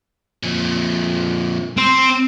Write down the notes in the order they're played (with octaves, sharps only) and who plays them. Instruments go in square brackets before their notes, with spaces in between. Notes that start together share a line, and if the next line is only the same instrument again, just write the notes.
[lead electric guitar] F2 A#2
[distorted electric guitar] C4